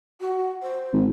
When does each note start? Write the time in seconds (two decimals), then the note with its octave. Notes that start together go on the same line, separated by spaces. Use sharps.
0.21 F#4
0.63 C5
0.93 G#1